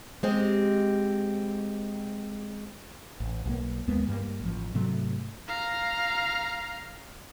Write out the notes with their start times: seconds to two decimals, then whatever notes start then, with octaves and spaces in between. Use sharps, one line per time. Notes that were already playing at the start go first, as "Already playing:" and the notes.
0.23 G#3 C4 G4 D#5
3.20 A1
3.46 B1 E3 A#3
3.88 D#2 G#3 A#3 B3
4.08 G2 G3 G#3 A#3
4.41 A1 F3
4.74 G#2 C3 F#3 A3
5.48 F5 A#5